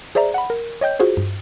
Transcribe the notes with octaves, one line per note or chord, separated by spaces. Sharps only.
G#4 C5 D5 E5 A#5
F#5 B5
A#4
C#5 D#5 G5 G6
F4 F#4 G#4 C5
G2